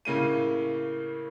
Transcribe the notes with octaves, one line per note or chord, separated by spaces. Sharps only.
A2 C#3 A#3 D#7